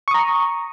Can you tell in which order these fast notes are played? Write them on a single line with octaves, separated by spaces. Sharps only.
C#6 D#6 A#5